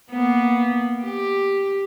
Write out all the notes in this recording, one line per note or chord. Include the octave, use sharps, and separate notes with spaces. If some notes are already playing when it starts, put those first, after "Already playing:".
A#3 B3
G4